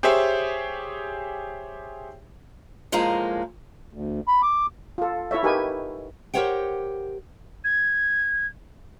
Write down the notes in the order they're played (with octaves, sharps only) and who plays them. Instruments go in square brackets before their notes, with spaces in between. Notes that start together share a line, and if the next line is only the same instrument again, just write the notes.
[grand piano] G4 G#4 C5 C#5 E5
[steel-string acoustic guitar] A2 F3 G#3 A#3 F5 A#5
[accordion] D2
B5
D6
[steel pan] F4 A4
E4 A4 C#5 E5
D#4 G4 A#4 B4 G#5
[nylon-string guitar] G4 A#4 C5 C#5 F#5 G5
[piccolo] G#6